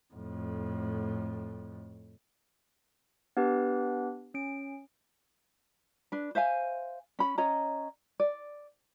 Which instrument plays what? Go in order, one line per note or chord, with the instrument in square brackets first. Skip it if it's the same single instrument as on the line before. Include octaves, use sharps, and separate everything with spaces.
[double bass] F2 A2
[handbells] B3 D4 G4 B4
C#4 D7
[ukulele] D4 B4
C5 E5 F5 G#5
C#4 B5
C#4 C#5 D#5 A#5
D5